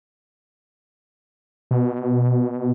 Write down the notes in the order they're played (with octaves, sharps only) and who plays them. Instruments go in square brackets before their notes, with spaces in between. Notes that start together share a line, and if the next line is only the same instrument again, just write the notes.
[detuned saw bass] B2